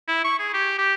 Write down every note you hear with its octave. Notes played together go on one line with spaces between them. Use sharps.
E4
C#6
G#4
G4
G4